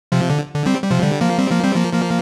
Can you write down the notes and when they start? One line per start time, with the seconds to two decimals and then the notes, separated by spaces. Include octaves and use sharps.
0.12 C3 F3
0.30 D3
0.54 D3
0.66 G3 C4
0.83 G3
0.91 C3 F3
1.03 D3 G3
1.21 F3 A#3
1.39 G3 C4
1.51 F3 A#3
1.63 G3 C4
1.76 F3 A#3
1.93 F3 A#3